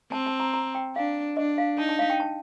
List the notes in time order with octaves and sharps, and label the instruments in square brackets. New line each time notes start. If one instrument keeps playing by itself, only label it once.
[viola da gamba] C4 [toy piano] A5
[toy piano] A5
A#5
A#5
G5
[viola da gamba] D4 [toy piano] F5
[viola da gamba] D4 [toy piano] D#5
[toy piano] F5
[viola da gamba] D#4 [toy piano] A5
[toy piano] A5
F5
G5
A5